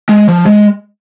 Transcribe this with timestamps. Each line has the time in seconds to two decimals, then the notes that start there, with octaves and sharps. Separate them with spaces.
0.09 G#3
0.29 F3
0.46 G#3